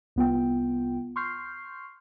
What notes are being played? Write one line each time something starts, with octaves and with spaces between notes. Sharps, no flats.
C2 B3 F4 G5
C6 C#6 F6 G6 C7